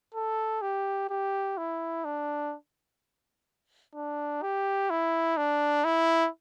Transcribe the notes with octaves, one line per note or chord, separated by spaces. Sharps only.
A4
G4
G4
E4
D4
D4
G4
E4
D4
E4